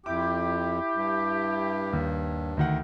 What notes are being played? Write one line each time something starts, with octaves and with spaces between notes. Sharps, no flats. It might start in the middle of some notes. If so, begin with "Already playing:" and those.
F2 E4 G4 D6
G2
D#2
D2 D#3 F#5